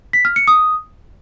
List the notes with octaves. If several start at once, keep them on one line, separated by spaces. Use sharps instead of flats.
B6
F6
C#7
D#6